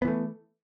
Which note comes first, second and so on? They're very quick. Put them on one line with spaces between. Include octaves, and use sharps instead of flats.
B3 E3 A3